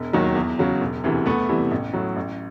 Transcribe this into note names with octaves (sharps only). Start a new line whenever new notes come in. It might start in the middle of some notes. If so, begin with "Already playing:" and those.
Already playing: E1
D#2 D#3 F#3
E2
C#3 F#3
E1
D2 C3 E3
E2 A3 B3
C3 E3 G3
A1
A2 F#3
A1